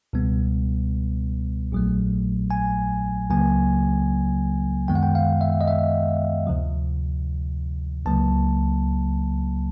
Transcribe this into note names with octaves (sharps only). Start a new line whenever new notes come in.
C#2 B2 G3 B3
A#1 A#2 F#3 A3
G#5
C#2 C#3 F#3 A#3 G#5
F#2 D#3 G#3 B3 G5
F#5
G5
F5
E5
D#5
E5
D2 C3 F3
C#2 C#3 F#3 A#3 A5